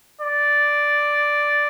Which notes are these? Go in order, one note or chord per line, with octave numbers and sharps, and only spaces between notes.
D5